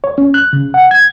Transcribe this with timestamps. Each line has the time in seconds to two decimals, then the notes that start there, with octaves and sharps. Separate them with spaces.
0.04 C#5
0.18 C#4
0.34 F#6
0.53 C#3
0.74 F#5
0.91 G#6